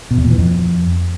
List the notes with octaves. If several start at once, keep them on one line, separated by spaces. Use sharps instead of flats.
B2
E2
A#2
E3
F2